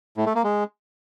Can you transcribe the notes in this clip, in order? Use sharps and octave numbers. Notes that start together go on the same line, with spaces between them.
A2
A3
A#3
G#3